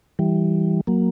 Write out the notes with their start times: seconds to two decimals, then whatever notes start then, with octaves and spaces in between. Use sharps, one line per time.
0.19 E3 G3
0.87 F#3 A#3